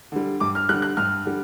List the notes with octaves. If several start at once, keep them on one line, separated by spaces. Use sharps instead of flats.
D3 G3
G2 D6
F6
D3 G3 F#6
F#6
G2 F6
D3 G3